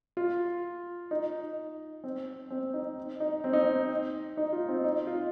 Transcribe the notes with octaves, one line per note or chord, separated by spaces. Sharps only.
F4
D#4
C4
C4
D#4
D#4
C4
D#4
C4
D#4
F4
C4
D#4
F4